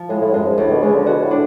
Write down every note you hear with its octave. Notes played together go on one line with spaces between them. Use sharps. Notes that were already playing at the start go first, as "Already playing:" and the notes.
Already playing: F3
A2 G#3
A2
F#2 G#3
G#2
D2 A2
B2
C#3 G#3
D3
B2 F#4
A2
D4